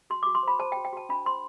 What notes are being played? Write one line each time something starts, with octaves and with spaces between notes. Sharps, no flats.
F#4 C6
F#4 D6
C6
C5 B5
C5 A5
G5
F#4
G5
F#4 A5
D4 B5
C5 C6